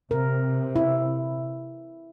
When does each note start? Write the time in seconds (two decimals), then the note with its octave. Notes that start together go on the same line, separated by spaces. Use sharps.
0.11 C3 A#4
0.76 E4